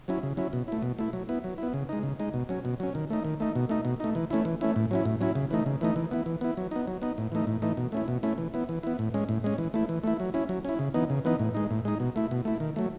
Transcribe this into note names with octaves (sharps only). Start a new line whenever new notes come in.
F#3 C#4 E4
C#3
F#3 C#4 E4
B2
A3 E4
B2
A3 E4
F#3
B3 E4
F#3
B3 E4
C#3
G#3 D#4
C#3
G#3 D#4
B2
F#3 C#4
B2
F#3 C#4
D#3
A3 D#4
D#3
A3 D#4
B2
A3 D#4
B2
A3 D#4
E3
A3 C#4 E4
E3
A3 C#4 E4
A2
F#3 C#4 E4
A2
F#3 C#4 E4
C#3
E3 A3 D#4
C#3
E3 A3 D#4
E3
B3 E4
E3
B3 E4
F#3
B3 D#4
F#3
B3 D#4
A2
E3 A3 D#4
A2
E3 A3 D#4
B2
A3 C#4 E4
B2
A3 C#4 E4
E3
B3 E4
E3
B3 E4
A2
G#3 C#4
A2
G#3 C#4
E3
A3 E4
E3
A3 E4
F#3
C#4 E4
F#3
C#4 E4
C#3
E3 B3 D#4
C#3
E3 B3 D#4
A2
G#3 D#4
A2
G#3 D#4
B2
A3 E4
B2
A3 E4
D#3
F#3 A3